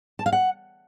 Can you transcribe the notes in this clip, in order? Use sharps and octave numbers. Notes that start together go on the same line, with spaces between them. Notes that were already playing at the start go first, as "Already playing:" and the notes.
A5
F5
F#5